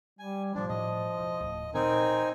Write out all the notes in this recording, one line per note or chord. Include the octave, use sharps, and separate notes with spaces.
G3 G#5
G#2 F3 F#3 D4
A2 D#5
E1 E4
D1
A#2 F3 C4 D#4 A#4 G#5